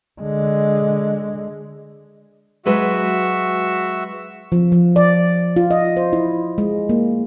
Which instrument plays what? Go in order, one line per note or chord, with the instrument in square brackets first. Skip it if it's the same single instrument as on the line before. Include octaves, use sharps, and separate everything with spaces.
[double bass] D3 G#3
[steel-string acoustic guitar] F#3 G#3 B4 [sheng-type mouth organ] F#4 E5
[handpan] F3
F3
D5
F4
D#5
C5
E4
G#3
A#3